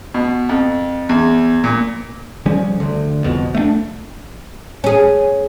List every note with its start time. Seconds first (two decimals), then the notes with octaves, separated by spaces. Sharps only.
0.14 B2
0.49 F2
1.09 E2
1.64 A#2
2.46 C#3 F3 G3 C#4
2.80 D2 D3
3.24 C2 F2 B2
3.55 A3 B3 D4
4.84 C#4 G#4